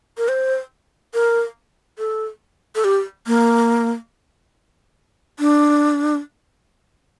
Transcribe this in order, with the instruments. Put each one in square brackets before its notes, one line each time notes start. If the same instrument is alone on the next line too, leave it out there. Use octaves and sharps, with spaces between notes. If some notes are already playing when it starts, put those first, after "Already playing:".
[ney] A#4
C5
A#4
A4
A4
G4
A#3
D4